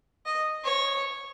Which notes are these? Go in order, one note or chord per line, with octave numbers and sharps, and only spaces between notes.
D#5
C#5